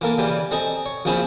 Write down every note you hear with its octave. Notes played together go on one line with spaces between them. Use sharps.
E3 A#3 A4
C#3 E3 G3
C4 A4 D#5 G#5 A#5
C#5
A#1 C#3 C4 G#4 A5 B5